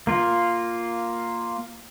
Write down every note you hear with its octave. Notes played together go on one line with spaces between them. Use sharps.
A#3 F4